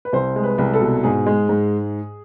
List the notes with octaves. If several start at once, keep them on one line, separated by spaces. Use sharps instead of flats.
B4
C2 C5
G#3
B4
C2
A4
B2
G#2 G#4
G#3
G#2